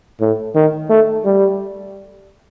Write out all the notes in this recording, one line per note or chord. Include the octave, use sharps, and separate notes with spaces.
A2
D#3
A3
G3